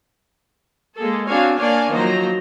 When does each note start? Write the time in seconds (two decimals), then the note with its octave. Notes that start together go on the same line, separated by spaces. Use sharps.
0.97 G#3 A#3 G#4 A4
1.28 C4 D4 F#4 C#5 F5 G#5
1.57 A#3 D4 C#5 D5 F5 G#5
1.90 D#3 F3 F#3 A#3 C5 A#5